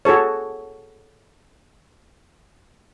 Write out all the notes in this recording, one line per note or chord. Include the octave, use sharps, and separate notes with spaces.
F#4 G#4 A4 C#5